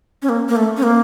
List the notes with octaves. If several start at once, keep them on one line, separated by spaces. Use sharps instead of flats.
C#4
A#3
A#3
A3
C#4
A#3